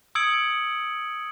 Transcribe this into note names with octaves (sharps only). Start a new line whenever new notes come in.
D#6 E6 G#6 C#7 D7 F#7